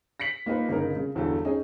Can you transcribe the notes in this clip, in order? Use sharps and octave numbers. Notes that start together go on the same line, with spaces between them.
A#6 B6 C#7 F#7
A#3 D#4 F4 B4
G1 C#3 D#4 A#4
C#3
G1 E2 G2 F#4 A4
C#4 D#4 G#4 D#5